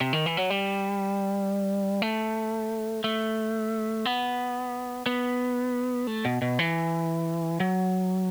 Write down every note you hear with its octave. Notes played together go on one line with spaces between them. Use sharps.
C3
D#3
E3
F#3
G3
A3
A3
B3
B3
A3
B2
B2
E3
F#3